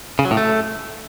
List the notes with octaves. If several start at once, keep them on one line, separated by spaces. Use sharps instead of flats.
C#3
F#3
A2
A3